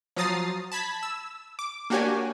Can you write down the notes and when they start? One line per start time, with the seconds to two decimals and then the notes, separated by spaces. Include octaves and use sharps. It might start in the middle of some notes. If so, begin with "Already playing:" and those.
0.16 F3 F#3 A#5 D#6 A6 C7
0.72 A5 B5 G#6 B6
1.03 E6
1.59 D6
1.90 A#3 D4 F#4 G4 C#5 G#5